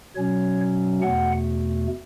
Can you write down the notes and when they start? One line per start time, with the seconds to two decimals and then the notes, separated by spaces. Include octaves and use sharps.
0.16 B2 F#3 C#4 C#5
1.01 E2 B2 A3 F#5